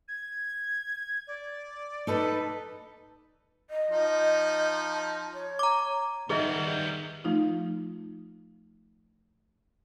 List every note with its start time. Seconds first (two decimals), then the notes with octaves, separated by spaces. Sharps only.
0.08 G#6
1.27 D5
2.07 D#4 A4 B4
3.70 D#5
3.91 F3 D#4
4.92 A5
5.34 C#5
5.59 A#5 D6
6.30 D#3 G3 B3 G#4 D#5 E5
7.24 F3 A3 D#4 F4